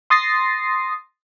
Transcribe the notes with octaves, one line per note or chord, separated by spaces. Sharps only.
C6 D#6 A6 A#6 C7